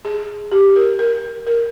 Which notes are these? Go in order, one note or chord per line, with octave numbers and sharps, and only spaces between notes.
G#4
G4
A#4
A#4
A#4